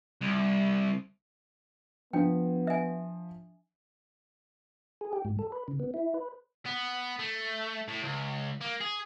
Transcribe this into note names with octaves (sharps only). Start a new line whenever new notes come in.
C2
F3 B3 D4 G5
E5 G#5
G#4
G4
G#2
A4
B4
C#3
B3
E4
B4
B3
A3
A2
C#2
A#3
G#4